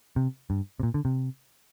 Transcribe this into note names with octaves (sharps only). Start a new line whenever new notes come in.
C3
G2
C3
A#2
D3
C3